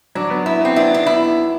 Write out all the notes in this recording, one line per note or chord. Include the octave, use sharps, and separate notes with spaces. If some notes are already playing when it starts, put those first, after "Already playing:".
F#3 D4
B3
B3 E4
B3 C4
D4 E4
B3 D4
B3 E4